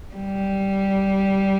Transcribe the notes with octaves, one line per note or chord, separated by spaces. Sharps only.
G3